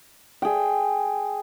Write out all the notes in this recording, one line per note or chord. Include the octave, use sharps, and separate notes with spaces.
G#4 G5